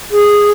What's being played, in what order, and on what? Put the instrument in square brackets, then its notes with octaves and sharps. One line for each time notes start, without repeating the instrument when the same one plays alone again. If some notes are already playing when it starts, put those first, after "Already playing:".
[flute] G#4